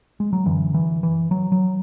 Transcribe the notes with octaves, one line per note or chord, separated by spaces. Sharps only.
G#3
F#3
F#2 D3 E3
E3
E3
F#3
F#3